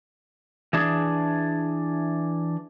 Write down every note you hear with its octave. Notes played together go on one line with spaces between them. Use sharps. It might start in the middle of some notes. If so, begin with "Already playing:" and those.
E3 D4 G#4